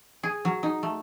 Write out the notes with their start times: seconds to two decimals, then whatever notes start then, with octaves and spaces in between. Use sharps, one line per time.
0.23 G#4
0.45 F#3
0.63 D#4
0.83 A3